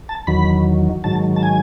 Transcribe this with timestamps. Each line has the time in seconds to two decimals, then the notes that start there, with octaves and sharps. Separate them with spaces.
0.09 A5
0.27 E2 D#3 F#3 B5
1.04 G#2 D#3 F#3 A5
1.36 A5
1.43 G#5